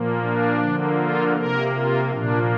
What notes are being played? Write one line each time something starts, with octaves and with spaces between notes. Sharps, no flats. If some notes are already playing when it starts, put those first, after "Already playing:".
Already playing: A#2 F3 A#3
D4
D3 F3 A#3
F4
C3 A#3 A#4
F4
A#2 F3 A#3 D4